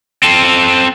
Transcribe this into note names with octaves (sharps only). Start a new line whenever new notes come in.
C4 A4